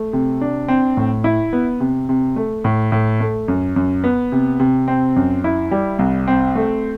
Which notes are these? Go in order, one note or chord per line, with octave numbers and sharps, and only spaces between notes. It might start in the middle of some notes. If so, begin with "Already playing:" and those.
Already playing: A3
C3
D4
C4
A2
E4
B3
C3
C3
A3
A2
A2
A3
F#2
F#2
B3
C3
C3
C4
F#2
E4
G3
C2
C4
A3